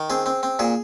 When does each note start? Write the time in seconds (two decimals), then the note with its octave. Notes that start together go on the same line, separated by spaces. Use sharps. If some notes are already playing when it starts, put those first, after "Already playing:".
Already playing: D#3
0.10 C4 G#4
0.26 C4
0.43 C4
0.59 A#2 G#4